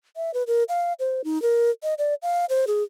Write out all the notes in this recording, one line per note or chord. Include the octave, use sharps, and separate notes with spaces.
E5
B4
A#4
F5
C5
D#4
A#4
D#5
D5
F5
C5
G#4